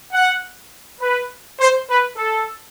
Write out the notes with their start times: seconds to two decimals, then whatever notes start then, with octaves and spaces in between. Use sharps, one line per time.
0.13 F#5
1.01 B4
1.59 C5
1.89 B4
2.17 A4